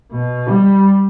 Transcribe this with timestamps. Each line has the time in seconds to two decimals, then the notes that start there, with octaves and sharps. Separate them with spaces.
0.12 B2
0.49 G3